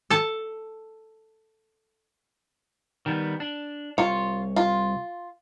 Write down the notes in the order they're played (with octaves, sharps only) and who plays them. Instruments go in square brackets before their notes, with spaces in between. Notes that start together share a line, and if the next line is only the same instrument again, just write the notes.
[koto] A4 A5
[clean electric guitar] D#3 G3 B3
D4
[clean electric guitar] C2 C#5 [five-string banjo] F4
[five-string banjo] F4